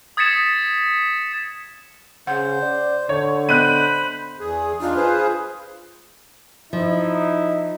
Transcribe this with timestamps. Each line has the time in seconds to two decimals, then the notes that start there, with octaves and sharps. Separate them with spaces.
0.17 D#6 G#6 A6 B6 C#7 E7
2.27 C#3 C5 F#5
2.62 D5
3.09 D3 C#5
3.49 B3 C5 D#5 B5 F#6 D#7
4.40 E2 G#4
4.81 E2 D4 D#4 F4
4.95 G#4 B4 C5
6.73 F3 D#4 E4